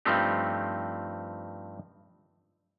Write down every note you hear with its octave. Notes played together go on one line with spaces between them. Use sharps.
G2 F3 A3 C4 D#4 G4